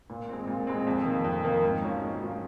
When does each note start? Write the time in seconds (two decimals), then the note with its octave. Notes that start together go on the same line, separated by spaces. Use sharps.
0.10 A#2
0.29 G#3 C4
0.47 A#2
0.67 G#3 C4
0.87 F2
1.05 D#3 A#3
1.24 F2
1.44 D#3 A#3
1.63 G#2
1.82 F#3 C#4 F4
2.01 G#2
2.21 F#3 C#4 F4